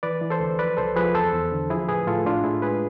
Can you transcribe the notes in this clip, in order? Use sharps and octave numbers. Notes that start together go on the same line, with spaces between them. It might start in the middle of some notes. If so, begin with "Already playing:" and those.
E3 B4 D5
E3
A4 C5
D2
F3 B4 D5
C2 A4 C5
F3 G#4 B4
E2 A4 C5
E2
D3
F3 E4 G#4
A2 G#4 B4
A2 F4 A4
A2 D4 F4
A2 E4 G#4
G#3 G#4 B4